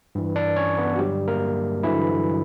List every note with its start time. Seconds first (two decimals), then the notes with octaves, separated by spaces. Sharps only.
0.15 G2 E3
0.36 D4 D5
0.56 C#4 C#5
0.78 B3 B4
0.96 F#4
0.99 G2 D3 F#3 G3 G4
1.28 A#3 A#4
1.83 G2 D3 E3 F#3 E4